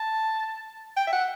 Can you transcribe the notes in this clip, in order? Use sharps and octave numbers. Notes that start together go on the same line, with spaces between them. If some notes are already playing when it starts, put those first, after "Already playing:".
Already playing: A5
G5
E5
F#5